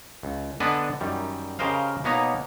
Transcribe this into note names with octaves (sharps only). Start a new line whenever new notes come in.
C#2
D3 B3 D4 B4 D#5 G#5
F#2 D#3 G3
C#3 G4 A#4 C5 D#5 F5
B2 A#3 B3 D#4 C#5 A#5